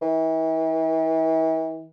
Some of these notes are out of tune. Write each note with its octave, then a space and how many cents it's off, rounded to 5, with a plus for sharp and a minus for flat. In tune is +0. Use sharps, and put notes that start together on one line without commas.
E3 -40